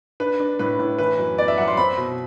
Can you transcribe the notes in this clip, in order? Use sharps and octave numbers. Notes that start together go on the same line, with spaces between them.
D4 B4
D4
A2 B4
A2
E3 B4
F#2
B3 D5
E5
F#2 F#5
C6
C4 B5
B2